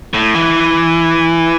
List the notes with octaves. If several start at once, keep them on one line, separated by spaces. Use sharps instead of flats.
A2
E3